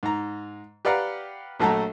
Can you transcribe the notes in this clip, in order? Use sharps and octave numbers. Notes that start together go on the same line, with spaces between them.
G#2 A#5
G4 B4 D5 F5 F#5 A#5
A#1 F#3 A3 A4 A#5